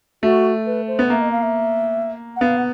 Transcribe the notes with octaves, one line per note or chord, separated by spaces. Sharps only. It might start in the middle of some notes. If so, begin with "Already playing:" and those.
A3 F#4
B4
C5
B3
A#3 E5
D#5
F5
E5
F#5
B3 F5
F#5